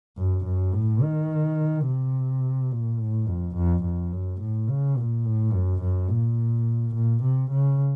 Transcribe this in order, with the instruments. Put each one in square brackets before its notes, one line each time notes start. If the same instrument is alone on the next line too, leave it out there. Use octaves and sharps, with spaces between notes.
[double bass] F#2
F#2
A2
D#3
C3
A#2
A2
F2
F2
F2
F#2
A2
C#3
A#2
A2
F#2
F#2
A#2
A#2
C3
C#3